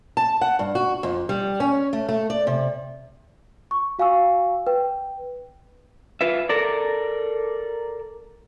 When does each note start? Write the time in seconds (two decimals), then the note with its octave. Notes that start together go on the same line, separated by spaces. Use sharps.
0.17 A5
0.41 F#5
0.59 G2
0.75 F#4
1.03 F2
1.29 G3
1.60 C#4
1.93 A3
2.09 A3
2.30 D5
2.47 C3
3.71 C#6
3.99 F#4 F5 G#5 C#6 E6
4.67 B4 G5
6.21 F4 B4 E5
6.49 A4 A#4 D5